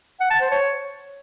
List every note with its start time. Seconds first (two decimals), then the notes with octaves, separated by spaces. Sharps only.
0.20 F#5
0.31 A5
0.41 C5
0.51 C#5